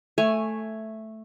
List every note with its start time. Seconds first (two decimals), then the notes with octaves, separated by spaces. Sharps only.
0.18 A3 C#5 G#5